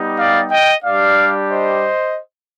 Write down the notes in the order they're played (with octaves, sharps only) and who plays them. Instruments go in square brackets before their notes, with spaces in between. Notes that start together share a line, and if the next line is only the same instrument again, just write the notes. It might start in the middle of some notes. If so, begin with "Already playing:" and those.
Already playing: [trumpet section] G3 B3 D#4 G4
D5 F5
D#5 G5
G3 D4 G4 D5 F5
C5 D#5